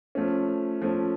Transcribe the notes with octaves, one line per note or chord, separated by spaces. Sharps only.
F3 A3 C#4
F3 A3 C#4